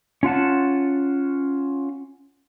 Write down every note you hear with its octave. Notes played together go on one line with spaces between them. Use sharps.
C#4 F4 F#5 A5